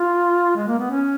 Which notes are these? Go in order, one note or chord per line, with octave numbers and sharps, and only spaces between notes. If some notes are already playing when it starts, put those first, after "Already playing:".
Already playing: F4
G#3
A#3
B3
C#4